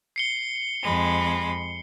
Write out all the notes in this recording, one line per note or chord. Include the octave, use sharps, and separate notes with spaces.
C7 C#7 G7
F2 G#3 B5